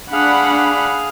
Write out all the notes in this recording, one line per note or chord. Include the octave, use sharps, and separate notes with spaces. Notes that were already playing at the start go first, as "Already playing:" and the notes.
D4 G#4 F5 F#5 B5